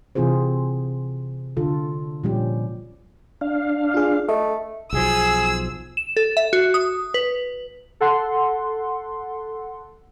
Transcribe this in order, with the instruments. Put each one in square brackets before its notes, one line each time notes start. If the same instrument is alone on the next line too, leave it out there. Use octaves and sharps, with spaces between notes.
[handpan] C3 E3 C4 F4 G#4 C5
D3 F4 A4
A#2 F3 G3 C#4 G4
[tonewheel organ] D4 F5
[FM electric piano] F4 G#4
[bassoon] A3 [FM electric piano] D#5
[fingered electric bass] B1 F3 [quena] G#4 [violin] E6
[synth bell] E7
A4
E5
F#4
D#6
B4
[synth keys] A4 F#5 C6